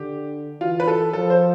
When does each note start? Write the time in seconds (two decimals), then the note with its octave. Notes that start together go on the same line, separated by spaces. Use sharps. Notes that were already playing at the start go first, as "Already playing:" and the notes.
Already playing: D3 G4
0.61 E3 F4
0.80 B4
0.87 A4
1.13 F3 A4
1.30 C5